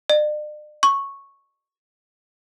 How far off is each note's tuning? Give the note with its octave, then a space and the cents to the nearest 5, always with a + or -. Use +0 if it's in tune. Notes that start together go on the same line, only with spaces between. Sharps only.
D5 +45
C#6 -5